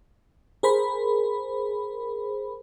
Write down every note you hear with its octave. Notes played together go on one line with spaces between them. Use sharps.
G#4 A#4 C5 B5